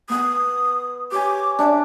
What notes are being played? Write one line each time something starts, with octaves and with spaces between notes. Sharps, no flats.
B3 F#5 D#6
G4 C#5 G#5 D6
D4 E5